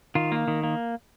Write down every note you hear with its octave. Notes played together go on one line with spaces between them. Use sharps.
D#3 F4
A#3
D#3
A#3